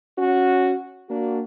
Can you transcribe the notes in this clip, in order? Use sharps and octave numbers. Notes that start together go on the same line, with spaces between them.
C#4 F#4
A#3 D4 F#4